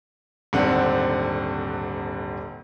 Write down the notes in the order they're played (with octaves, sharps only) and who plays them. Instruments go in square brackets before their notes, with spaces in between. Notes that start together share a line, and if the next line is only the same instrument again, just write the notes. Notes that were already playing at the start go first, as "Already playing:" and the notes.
[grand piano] D#1 G#1 D3 C4 F#5